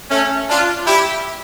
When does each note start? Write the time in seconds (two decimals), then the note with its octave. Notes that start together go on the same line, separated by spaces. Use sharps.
0.11 A3 C#4
0.49 D4 F4
0.87 E4 G4